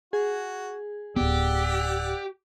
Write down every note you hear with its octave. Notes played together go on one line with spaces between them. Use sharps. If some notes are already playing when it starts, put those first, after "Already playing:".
F#4 G#4
D1 B3 G4 D5 F#5 E6